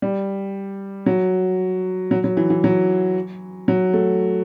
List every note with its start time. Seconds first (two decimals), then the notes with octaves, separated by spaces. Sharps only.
0.02 G3
1.06 F#3
2.11 F#3
2.24 F#3
2.37 E3
2.50 E3
2.64 F#3
3.68 F#3
3.93 A3